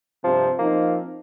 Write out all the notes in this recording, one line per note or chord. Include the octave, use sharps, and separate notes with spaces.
G2 C3 F3 C4
F3 A#3 C4 D#4